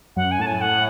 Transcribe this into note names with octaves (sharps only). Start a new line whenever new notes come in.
F#2 F#5
G#5
A2 A5
G#5
F#5